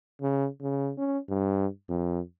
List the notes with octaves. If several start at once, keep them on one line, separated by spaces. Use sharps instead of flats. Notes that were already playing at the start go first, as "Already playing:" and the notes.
C#3
C#3
C#4
G2
F2